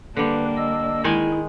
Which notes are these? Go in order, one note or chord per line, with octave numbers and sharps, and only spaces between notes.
D3 G3 A#3 D4 B4
D#5 E6
D#3 G#3 E4 G#4 G#5